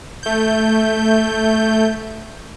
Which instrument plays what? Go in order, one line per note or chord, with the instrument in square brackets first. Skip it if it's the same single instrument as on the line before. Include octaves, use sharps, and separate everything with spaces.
[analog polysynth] A3 G6